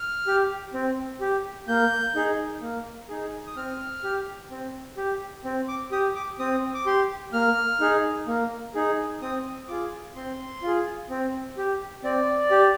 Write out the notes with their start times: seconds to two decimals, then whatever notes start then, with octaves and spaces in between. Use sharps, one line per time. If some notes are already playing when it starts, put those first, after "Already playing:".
Already playing: F6
0.27 G4
0.74 C4
1.20 G4
1.68 A#3 G6
2.15 D#4 G#4
2.62 A#3
3.09 D#4 G#4
3.47 D#6
3.56 C4 F6
4.04 G4
4.51 C4
4.97 G4
5.44 C4
5.68 D6
5.92 G4 D#6
6.15 D6
6.39 C4 D#6
6.74 D6
6.86 G4 C6
7.33 A#3 F6
7.80 D#4 G#4
8.27 A#3
8.75 D#4 G#4
9.22 C4 D#6
9.68 F4 G#4 D6
10.16 C4 C6
10.62 F4 G#4
11.10 C4
11.57 G4
12.04 C4 D5
12.51 G4